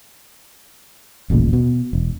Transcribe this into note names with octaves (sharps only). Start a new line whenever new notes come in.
D#1 A1 A#2 C#3
B2
E1